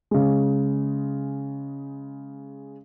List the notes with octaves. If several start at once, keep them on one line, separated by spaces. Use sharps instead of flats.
C#3 G#3